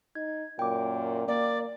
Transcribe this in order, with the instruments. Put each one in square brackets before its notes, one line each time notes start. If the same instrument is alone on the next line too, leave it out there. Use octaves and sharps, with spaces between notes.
[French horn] D#4 [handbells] G#6
[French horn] F#2 [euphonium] A#2 [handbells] G5 D6
[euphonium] A#3 [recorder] D5